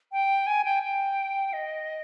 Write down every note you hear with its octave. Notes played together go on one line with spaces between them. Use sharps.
G5
G#5
G5
G5
D#5